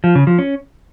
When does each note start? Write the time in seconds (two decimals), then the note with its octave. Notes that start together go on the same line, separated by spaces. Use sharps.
0.04 F3
0.15 C#3
0.27 F3
0.39 C#4